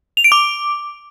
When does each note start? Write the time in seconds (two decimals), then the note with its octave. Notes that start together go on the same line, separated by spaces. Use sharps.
0.17 F7
0.24 D7
0.32 D6